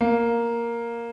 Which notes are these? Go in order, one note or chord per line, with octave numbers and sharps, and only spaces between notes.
A#3